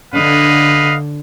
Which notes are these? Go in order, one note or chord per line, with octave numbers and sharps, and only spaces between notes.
D3 B4 D#5 F5